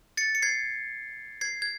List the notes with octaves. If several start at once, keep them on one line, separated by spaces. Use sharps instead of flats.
A6 C#7
C#7
G#6 C7
G#6 C7
G#6